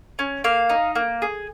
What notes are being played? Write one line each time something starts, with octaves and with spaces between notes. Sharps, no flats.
C#4
A#3 F5
D#4
A#3
G#4